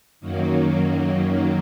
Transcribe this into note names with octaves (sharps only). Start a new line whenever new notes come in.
F#2 D#3 F#3 A#3